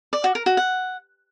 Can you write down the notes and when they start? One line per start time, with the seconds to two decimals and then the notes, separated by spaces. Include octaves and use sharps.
0.13 D5
0.24 F#4
0.35 A#4
0.46 F#4
0.57 F#5